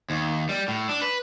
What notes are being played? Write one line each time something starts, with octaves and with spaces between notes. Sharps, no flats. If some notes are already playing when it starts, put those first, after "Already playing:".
D#2
G3
A2
D4
B4